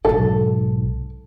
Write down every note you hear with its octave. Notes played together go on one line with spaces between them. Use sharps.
B1 G#2 A4